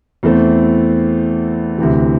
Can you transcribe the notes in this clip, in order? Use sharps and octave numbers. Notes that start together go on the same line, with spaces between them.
E2 E3 A3 C4
D2 C3 E3